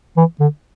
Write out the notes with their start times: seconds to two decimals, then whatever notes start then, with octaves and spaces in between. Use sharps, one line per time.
0.17 E3
0.40 D3